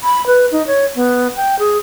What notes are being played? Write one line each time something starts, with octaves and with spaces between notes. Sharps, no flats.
B5
B4
D#4
C#5
B3
G5
G#4